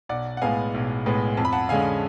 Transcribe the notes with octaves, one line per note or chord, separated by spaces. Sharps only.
B1 D5 F#5
F#5
A2 G#3 B3 F5 G#5
B1
A2 G#3 B3
F2 A5
B5
F#5 A5
D3 G#3 C#4 F5 G#5